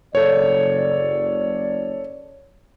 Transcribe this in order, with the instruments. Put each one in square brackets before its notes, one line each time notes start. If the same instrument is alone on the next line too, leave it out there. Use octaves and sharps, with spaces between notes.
[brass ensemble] F#1 D5 [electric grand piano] A4 C#5